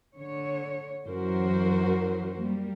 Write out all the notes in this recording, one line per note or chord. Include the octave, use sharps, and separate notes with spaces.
D3 C#5
F#2 E3 F#3 F#4 A#4 C5
G3 A#3